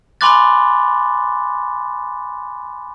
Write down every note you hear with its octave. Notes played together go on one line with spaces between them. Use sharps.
G#5 B5 C6 D6 F#6 A6